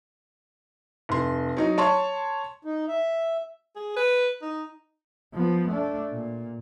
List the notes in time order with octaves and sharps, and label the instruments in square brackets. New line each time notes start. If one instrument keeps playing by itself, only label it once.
[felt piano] F1 C6
F#3 D#4 D#5
C#5 A5 C6 C#6
[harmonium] D#4
E5
[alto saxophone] G#4
B4
D#4
[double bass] F3 B3
A3 D4
A#2